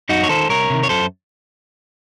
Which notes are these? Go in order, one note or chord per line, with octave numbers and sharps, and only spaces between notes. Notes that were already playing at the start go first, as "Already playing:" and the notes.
F#2 D#4 F#4
C#5
D#3 A4 C5
C2 A#4 C#5
C3 D#3
C#5
F#2 A4 C5